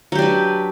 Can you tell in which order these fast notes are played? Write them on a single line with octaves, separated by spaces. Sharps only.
F#3 G4 D4 B4